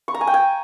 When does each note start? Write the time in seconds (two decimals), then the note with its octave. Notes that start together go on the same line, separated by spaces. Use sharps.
0.08 C#6
0.14 A#5
0.21 G#5
0.27 G5
0.34 G#5